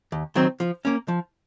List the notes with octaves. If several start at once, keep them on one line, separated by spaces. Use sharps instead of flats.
D#2
D#3 F#3 C4
F3
A#3 C#4
F3